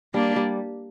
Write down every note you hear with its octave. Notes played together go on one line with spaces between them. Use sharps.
G3 A#3 D4
G3